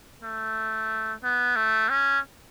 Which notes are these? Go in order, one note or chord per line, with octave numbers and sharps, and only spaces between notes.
A3
B3
A3
C#4